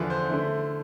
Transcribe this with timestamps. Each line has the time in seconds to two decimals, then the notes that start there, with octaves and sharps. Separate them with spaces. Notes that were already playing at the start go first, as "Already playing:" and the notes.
Already playing: E2 D3 F3 B3 B4
0.10 C5
0.30 D3 A3 E4